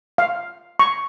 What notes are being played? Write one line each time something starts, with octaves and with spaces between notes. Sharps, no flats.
F5
C#6